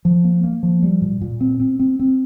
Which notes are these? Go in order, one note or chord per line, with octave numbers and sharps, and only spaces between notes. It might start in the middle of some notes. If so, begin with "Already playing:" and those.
F3
A#3
A#3
F3
G3
A#2
A#2
C4
C4
C4
C4